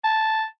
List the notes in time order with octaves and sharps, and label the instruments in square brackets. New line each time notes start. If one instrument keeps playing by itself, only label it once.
[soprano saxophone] A5